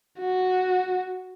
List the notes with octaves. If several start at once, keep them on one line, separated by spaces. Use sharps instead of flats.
F#4